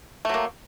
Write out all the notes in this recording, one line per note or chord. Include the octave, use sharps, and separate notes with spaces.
F#3 A3 A#3